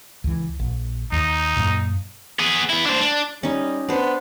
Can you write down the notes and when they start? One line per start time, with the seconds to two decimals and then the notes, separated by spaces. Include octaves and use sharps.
0.24 C#2 E3
0.60 A#1
1.12 D#2 D#4
1.57 F#2 A#2
2.39 B3 G#4
2.70 B3 E4
2.86 D4 C5
3.01 D4
3.43 G3 C#4 D#4
3.89 B3 D4 C5